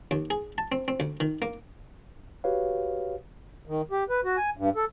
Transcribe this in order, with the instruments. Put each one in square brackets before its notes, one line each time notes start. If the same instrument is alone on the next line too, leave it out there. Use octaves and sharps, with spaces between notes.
[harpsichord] D#2
G#4
A5
C4
C4
D2
D#3
A#3
[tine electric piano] F#4 G4 B4 C#5 F5
[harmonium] D#3
G4
B4
F#4
G#5
G2
A4